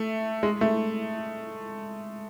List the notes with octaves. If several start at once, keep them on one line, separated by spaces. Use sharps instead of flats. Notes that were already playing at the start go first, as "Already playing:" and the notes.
Already playing: A3
G#3
A3